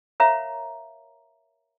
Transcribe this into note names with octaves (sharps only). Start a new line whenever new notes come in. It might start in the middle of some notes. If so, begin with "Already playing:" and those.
A#4 C#5 E5 F5 A#5